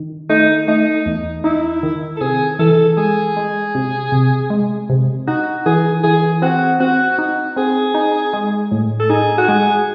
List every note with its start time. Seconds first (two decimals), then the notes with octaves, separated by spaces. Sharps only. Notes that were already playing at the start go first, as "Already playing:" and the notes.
Already playing: D#3
0.29 A3 D#4
0.68 A3 D#4
1.06 E2
1.44 D#4 E4
1.83 D#3
2.17 A4
2.21 C3 G#4
2.59 E3 A4
2.97 G#3 G#4
3.37 G#3
3.75 C3
4.12 C3
4.50 G#3
4.90 C3
5.27 D#4 F#4
5.66 E3 G#4
6.03 E3 G#4
6.42 C4 F#4
6.80 C4 F#4
7.19 D#4
7.56 C4 G#4
7.94 D#4
8.33 G#3
8.71 A2
8.99 A4
9.10 D#4 G#4
9.38 F#4
9.48 G#3 G#4